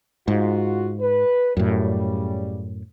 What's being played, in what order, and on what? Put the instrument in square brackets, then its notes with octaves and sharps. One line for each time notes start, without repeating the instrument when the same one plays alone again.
[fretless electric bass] G#2 [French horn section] F4 F#4
[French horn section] B4
[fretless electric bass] F#2 A2 [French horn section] C#3 G3